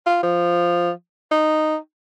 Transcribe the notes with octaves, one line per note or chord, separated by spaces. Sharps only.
F4
F3
D#4